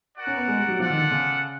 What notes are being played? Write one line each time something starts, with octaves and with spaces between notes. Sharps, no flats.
F#4 A#4 D5 F#5
C#4
B3
G#3
G3
F#3
F3 F4 A4 D5 F#5
D#3
D3
C#3